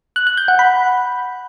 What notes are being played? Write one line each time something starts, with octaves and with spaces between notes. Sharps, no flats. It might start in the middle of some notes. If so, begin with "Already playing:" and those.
F#6
F#6
G6
F#5
B5